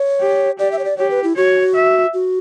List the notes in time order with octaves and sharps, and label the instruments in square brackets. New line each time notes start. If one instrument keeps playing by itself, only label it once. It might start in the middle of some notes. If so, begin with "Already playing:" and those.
Already playing: [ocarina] C#5
[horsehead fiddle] G4
[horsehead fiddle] G4 [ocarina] D5
[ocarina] E5
C#5
D5
[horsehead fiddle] G4 [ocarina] C#5
[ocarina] B4
E4
[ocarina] F#4 [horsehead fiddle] C#5
[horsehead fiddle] E5
[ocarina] F#4